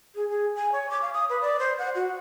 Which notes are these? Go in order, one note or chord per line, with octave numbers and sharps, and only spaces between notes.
G#4
G#4
G#5
C#5
D6
F5
D#6
B4
D5
C5
F#5
F#4